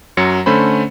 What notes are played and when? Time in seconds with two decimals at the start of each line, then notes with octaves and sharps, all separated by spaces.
0.17 F#2 F#3 C#7
0.46 D3 A3 C#4 C5 B5